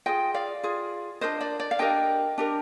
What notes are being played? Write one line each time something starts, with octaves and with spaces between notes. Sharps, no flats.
F4 G#4 D#5 G5
D5 F5
F4 G#4
D4 G4 A#4 C5 D#5
D5
D5
F5
D4 G4 A#4 D#5 G5
D4 G4 A#4